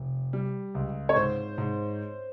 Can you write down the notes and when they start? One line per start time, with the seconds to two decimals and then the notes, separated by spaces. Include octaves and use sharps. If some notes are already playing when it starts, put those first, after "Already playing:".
Already playing: F1
0.33 G3
0.75 C#2
1.09 C#5
1.16 G#2 C5
1.58 G#2